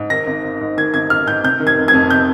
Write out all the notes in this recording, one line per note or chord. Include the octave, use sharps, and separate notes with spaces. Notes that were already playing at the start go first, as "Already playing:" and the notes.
Already playing: G#2
D#3 A#6
G#1
G#1
G#2
D#3 G#6
G#1 G#6
G#1 F6
G#2 G6
C3 G6
D#3
G#6
F1
G#6
F2
C3 G6